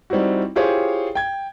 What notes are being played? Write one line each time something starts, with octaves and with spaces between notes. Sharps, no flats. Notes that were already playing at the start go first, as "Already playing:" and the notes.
G3 C4 D#4 E4 F#4
E4 F4 G4 G#4 C5 C#5
G5 G#6